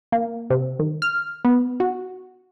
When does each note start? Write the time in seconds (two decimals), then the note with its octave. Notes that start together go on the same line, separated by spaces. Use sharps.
0.12 A#3
0.50 C3
0.79 D#3
1.02 F6
1.45 B3
1.80 F#4